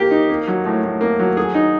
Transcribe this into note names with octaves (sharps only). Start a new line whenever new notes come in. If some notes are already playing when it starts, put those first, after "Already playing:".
Already playing: A#3 G4
D#4
A#3
F#3
A2
A2
A#3
F#3
G#4
D#4